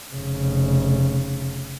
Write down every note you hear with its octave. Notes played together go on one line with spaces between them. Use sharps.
F1 C#3